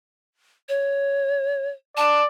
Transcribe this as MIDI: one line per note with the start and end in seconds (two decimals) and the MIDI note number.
0.69 1.68 73
1.97 2.25 74
1.97 2.21 81